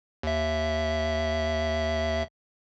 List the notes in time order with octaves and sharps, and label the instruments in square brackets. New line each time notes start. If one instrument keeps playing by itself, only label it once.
[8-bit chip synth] D#2 E5